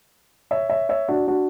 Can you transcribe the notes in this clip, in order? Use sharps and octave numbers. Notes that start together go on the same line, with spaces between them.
C#5 E5
C#5 E5
C#5 E5
D4 F#4
D4 F#4